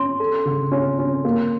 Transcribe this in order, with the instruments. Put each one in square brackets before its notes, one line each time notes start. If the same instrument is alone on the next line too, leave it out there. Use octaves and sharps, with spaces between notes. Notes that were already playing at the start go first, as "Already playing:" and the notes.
Already playing: [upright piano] C#4 [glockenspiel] C6
[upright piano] A4
C#3
C#4
C#4
A#3